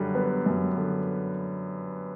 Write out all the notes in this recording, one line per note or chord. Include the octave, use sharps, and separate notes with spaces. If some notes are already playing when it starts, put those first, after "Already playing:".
Already playing: F#2 D3 G3
B3
F#2
D3